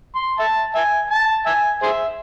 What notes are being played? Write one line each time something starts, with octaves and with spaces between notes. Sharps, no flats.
C6
E5 A5
E5 G#5
A5
E5 G#5
G#4 C5 E5